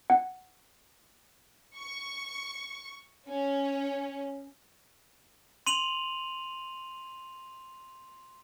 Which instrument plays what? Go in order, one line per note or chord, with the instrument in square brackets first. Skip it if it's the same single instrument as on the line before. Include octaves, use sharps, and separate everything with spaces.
[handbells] F#5
[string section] C#6
C#4
[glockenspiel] C6 D#7 F7 F#7